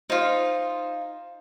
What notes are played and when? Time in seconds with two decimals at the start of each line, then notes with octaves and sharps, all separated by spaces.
0.10 D#4 F4 C5